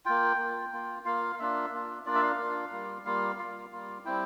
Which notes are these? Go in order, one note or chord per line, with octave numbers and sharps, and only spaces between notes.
A#3 F4 G5
A#3 F4
A#3 F4
A#3 F4 F5
A#3 D4 F4 E5
A#3 D4 F4
A#3 D4 F4 D5
E5
F5
A#3 D4 F4
G3 A#3 F4
G3 A#3 F4 F5
G3 A#3 F4 F5
G3 A#3 F4
G3 C4 E4 G5